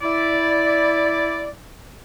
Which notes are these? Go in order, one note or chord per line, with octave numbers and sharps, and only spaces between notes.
E4 D5